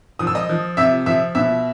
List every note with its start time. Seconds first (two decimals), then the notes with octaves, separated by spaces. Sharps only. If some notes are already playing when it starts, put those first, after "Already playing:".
0.19 F3 D#6
0.27 E6
0.35 D#5 D#6
0.49 F3
0.77 C3 E5 E6
1.06 F3 E5 E6
1.35 B2 E5 E6